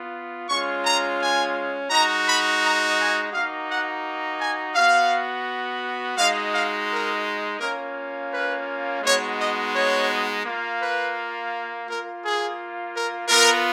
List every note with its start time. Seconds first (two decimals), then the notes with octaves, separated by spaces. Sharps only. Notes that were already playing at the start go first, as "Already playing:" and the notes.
Already playing: B3 F4
0.48 G#3 C#4 F4 C#6
0.84 A#5
1.20 G#5
1.90 G#3 D#4 F#4 A#5
2.27 B5
2.61 A#5
2.98 G#5
3.32 A#3 D#4 F#4 F5
3.69 F#5
4.39 G#5
4.75 B3 F#4 F5
6.17 G#3 D#4 F#4 F5
6.52 F5
6.89 A#4
7.60 A#3 C#4 F4 A#4
8.31 B4
9.02 G#3 B3 D#4 F#4 C#5
9.38 D#5
9.73 C#5
10.44 A#3 F4
10.79 B4
11.87 A#3 F4 A#4
12.22 G#4
12.94 A#4
13.28 B3 F4 A#4